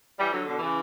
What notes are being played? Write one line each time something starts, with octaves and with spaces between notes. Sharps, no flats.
E3 G3
D3 F#3
B2 D3
C#3 E3